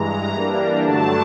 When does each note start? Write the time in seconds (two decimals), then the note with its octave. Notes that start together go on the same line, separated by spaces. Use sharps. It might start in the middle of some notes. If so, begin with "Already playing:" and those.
Already playing: G2 E3 G#3 A#5
0.31 E3 G3 A#3 D4
0.83 G2 D3 F#3 A3 D4 A5